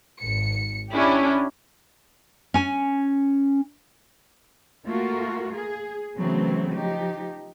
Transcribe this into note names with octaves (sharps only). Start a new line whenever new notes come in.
G#1 C#7
C#4 D4 E4 G4
C#4 G#5
A3 A#3 F4 F#4 A#4
G#4
C#3 E3 F#3 A3 B3 C4
F3 D#4 G4